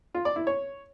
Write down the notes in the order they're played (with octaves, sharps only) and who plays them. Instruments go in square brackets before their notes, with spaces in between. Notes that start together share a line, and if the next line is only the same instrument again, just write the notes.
[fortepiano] F4
D5
E4
C#5